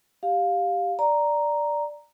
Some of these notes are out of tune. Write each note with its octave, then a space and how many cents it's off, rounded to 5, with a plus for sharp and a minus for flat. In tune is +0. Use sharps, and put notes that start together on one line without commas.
G4 +0 F5 +10
D5 +0 A#5 +0